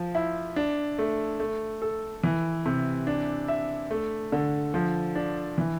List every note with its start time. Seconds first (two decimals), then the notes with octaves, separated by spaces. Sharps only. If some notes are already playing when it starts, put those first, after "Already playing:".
Already playing: F3
0.15 E4
0.56 D4
0.98 A3
1.40 A3
1.82 A4
2.23 E3
2.66 C3
3.07 D4
3.48 E5
3.91 A3
4.32 D3
4.74 F3
5.15 D4
5.58 E3